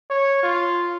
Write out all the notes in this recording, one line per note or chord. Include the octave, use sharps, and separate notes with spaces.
C#5
F4